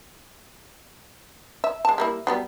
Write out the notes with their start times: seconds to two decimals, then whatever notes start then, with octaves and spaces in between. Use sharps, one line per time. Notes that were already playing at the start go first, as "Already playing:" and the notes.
1.64 E5
1.85 G#3 A5
1.98 G3 A#3 E4
2.27 F#3 G3 B3